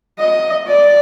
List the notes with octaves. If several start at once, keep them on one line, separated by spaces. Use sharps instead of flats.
D#5
D5